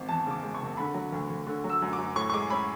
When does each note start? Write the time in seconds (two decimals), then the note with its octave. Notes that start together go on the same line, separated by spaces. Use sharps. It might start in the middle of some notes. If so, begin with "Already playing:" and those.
Already playing: G#1
0.09 E2 A5
0.26 C#3 D6
0.43 G#3
0.54 C#6
0.61 F#1
0.77 D3 B5
0.94 F#3
1.12 D2
1.30 D2
1.47 D3
1.64 F#3
1.69 E6
1.82 F#2
1.93 D6
1.98 F#2
2.16 A2 C#6
2.30 C#6
2.34 G#3 D6
2.50 C#4 B5